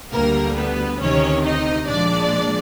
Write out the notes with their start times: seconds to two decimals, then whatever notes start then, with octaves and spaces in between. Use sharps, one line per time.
0.12 D2 D3 G3 A#3 A#4
0.56 B3 B4
1.00 D2 C3 D#3 C#4 C#5
1.44 D#4 D#5
1.88 A#2 F3 G#3 D4 D5